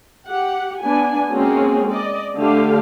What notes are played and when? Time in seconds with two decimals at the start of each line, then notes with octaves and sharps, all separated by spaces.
0.26 G4 F#5
0.81 B3 D4 G#5
1.31 G#3 A#3 C4 C#4 F#4 G#4
1.91 D5 D#5
2.35 D3 A3 G4 F5